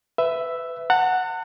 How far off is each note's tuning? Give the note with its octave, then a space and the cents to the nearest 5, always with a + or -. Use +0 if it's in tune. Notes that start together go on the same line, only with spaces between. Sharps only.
B4 +25 E5 +0
F#5 +0 A5 +45